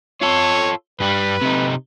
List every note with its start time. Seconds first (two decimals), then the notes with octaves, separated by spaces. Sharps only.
0.21 F4 A4 C#5
1.00 G2 G3 B4
1.41 C3 D#4